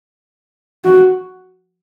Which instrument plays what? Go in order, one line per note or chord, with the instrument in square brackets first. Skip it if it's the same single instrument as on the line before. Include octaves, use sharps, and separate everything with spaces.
[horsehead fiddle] F#4